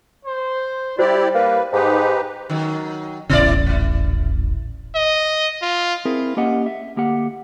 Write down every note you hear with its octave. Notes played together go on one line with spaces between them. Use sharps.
C5
G3 E4 F#4 G4 C5 D5
A#3 B4
G#2 D#4 G4 B4 D#5
D#3 F#3
D#1 A1 C#3 B3 E4 D5
A3 E4
D#5
F4
C4 E4 G#4 A#4 C5
A#3 C#4 G4 D#5 F#5
E5
D2 A#3 G4 F#5